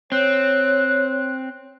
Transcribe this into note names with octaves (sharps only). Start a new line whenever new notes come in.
C4 C#5 F#6